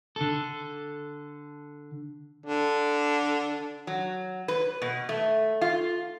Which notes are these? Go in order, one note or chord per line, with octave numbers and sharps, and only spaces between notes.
D3 A4
D3
F#3
B4
B2
A3
F4